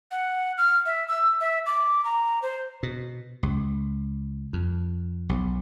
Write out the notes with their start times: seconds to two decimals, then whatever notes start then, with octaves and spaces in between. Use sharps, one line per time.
0.11 F#5
0.58 F6
0.86 E5
1.08 E6
1.41 E5
1.66 D6
2.05 A#5
2.42 C5
2.83 B2
3.43 C#2
4.53 F2
5.29 B1